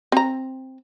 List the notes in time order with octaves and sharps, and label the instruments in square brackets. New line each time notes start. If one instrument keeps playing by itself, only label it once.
[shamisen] C4 A#5